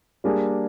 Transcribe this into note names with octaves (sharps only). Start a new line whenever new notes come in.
G3 A#3 D4 G#4